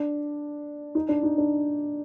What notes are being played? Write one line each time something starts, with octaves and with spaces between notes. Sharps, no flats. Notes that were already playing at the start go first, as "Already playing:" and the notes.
Already playing: D4
D#4
D4
D#4
D4